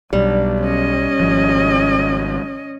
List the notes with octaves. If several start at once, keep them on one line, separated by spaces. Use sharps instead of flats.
B1 G3 D4
C#4 D#5
G#1 F3